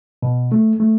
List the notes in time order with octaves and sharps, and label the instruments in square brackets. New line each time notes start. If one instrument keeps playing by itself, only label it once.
[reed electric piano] B2
A3
A3